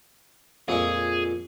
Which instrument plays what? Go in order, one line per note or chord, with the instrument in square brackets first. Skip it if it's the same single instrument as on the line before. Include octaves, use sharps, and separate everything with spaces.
[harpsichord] F2 A#2 G#3 [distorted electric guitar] G#4